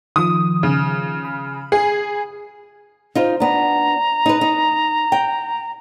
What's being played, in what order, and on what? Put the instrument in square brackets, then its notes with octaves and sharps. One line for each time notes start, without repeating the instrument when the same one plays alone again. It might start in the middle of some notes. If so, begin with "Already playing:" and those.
[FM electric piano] D#3 F3 [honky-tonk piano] D#6
[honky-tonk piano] C#3
[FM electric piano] B5
[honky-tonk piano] G#4
[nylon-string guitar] D#4 F4 C5
[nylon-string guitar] B3 D4 [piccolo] A#5
[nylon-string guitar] D#4 B4
D#4
G5